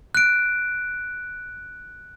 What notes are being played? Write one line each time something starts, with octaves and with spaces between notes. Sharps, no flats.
F#6 D7